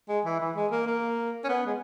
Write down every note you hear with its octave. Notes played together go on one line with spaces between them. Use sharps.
G#3
E3
E3
G#3
A#3
A#3
C#4
B3
G#3